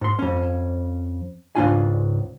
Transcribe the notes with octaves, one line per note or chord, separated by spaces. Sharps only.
G#2 C6
F2 C#4
C#2 G#2 E3 D4 F4 G#5